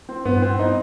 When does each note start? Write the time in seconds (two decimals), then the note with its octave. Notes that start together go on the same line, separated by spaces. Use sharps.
0.09 C4
0.25 G2 B3
0.42 C4
0.59 D#4